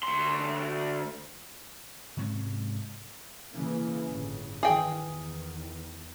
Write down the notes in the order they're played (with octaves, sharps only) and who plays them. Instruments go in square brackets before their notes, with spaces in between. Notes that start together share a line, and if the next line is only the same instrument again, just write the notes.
[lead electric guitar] D2 C6
[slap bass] G#2 C3 G#3 C#4
[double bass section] C#3 E3 A#3
G1 A2 C#3
[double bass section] D#3 E3 [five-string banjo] G#4 G5
[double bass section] E2 D#3